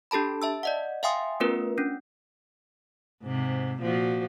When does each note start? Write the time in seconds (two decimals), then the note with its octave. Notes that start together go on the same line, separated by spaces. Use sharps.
0.11 D4 G4 A4 A5 B5
0.42 E5 A5 E6
0.63 D5 D#5 F#5
1.03 E5 F5 G5 G#5 C6 D#6
1.40 A3 B3 C#4 F4 A#4 B4
1.78 C#4 D4
3.23 G#2 C3
3.81 A#2 F3 F#4